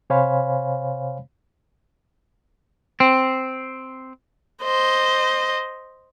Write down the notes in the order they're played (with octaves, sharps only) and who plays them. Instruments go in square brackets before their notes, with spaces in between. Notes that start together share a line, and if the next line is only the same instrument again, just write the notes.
[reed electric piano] C3 C5 C#5 F5 G#5 B5
[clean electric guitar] C4
[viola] C5 D#5